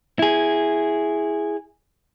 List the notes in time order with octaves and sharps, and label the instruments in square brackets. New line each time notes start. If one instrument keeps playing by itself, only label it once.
[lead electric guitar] E4 G#4